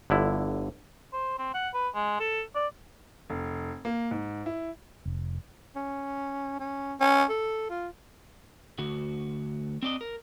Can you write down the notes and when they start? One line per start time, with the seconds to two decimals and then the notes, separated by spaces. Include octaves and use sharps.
0.10 G1 D3 E4
1.13 C5
1.38 C4
1.54 F#5
1.74 B4
1.95 G#3
2.20 A4
2.55 D5
3.30 F1
3.85 A#3
4.11 G#2
4.46 E4
5.06 F1
5.76 C#4
6.60 C#4
7.00 C#4
7.29 A4
7.70 F4
8.79 D2 F#4
9.83 C4 D5 D#5
10.01 A#4